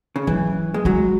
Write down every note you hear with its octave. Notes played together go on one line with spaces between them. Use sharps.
C#3
E3 F#3
G#3
F#3 G#3